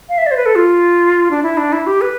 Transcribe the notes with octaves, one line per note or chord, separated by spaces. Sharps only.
F5
E5
D5
C5
B4
A4
F4
D4
E4
D4
E4
G4
B4